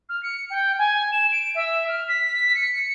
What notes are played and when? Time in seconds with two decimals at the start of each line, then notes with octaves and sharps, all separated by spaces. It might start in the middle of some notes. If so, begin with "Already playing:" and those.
0.09 F6
0.23 C#7
0.50 G5
0.79 G#5
1.12 E7
1.32 D7
1.55 E5
1.88 F6
2.08 B6
2.55 C#7